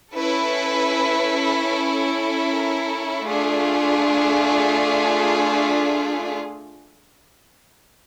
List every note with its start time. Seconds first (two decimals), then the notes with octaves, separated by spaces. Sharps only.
0.13 C#4 E4 A4 B4
2.46 A#4
3.24 A3 D4 F4 G#4